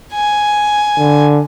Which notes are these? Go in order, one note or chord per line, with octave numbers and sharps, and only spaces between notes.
G#5
D3